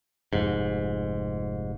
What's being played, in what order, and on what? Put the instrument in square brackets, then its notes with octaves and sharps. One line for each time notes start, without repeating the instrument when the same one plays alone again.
[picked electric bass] F1 G#2